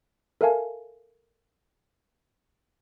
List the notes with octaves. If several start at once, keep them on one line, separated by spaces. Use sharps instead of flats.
A4 A#4 E5 F5 G#5 A5